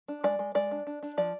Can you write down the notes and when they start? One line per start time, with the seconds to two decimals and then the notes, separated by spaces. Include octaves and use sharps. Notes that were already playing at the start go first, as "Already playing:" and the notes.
0.08 D4
0.24 G#3 D5
0.39 G#3
0.55 G#3 D5
0.71 D4
0.87 D4
1.03 D4
1.17 F3 D5